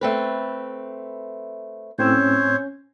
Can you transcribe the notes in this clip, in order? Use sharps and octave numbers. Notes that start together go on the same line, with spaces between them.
A3 C4 B4
A2 C4 C#4 C5 C#5 E6